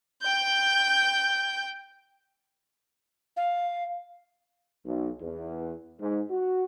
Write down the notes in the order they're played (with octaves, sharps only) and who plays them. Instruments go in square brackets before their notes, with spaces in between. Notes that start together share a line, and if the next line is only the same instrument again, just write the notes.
[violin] G5 G6
[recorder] F5
[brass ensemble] B1
E2
G#2
F#4